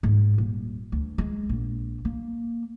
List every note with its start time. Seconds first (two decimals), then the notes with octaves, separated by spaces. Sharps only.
0.03 G#2
0.38 D#1
0.92 D2
1.18 G#3
1.49 A#1
2.05 A#3